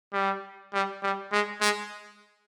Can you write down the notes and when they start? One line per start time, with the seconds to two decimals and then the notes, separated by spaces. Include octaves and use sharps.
0.13 G3
0.73 G3
1.03 G3
1.32 G#3
1.61 G#3